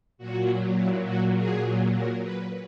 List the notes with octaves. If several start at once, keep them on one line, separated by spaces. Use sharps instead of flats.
A#2 F#3 F#4
E4
F#4
G#4
A#4
B4